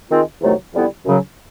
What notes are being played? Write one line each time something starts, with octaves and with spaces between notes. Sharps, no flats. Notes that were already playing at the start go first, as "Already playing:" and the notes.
D#3 G#3 C4 F4
E2 C3 D#3 F#3 A3
F2 D3 G3 B3 E4
F#2 C#3 F#3